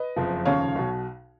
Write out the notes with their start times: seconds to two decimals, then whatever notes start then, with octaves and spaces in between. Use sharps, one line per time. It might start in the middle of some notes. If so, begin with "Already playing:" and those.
Already playing: B4 D#5
0.16 F#1 F2 F3
0.45 F1 D#2 C#3 F3 C#5 F5
0.76 B1 B2